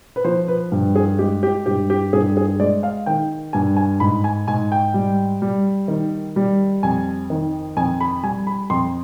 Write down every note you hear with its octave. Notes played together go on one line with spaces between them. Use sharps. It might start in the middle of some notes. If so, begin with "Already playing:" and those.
B4
F3 C5
B4
G2
G#4
G#3 G4
G4
G2 G4
G4
G2 G#4
G#4
G#3 D5
F5
D#3 G5
G2 G#5
G#5
G#2 B5
G#5
G#2 G#5
G5
G3
G3
D#3
G3
F2 G#5
D#3
F2 G#5
B5
G3 G#5
B5
F2 C6